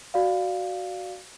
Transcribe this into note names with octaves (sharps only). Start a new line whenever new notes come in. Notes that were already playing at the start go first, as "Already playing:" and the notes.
F#4 D5 F5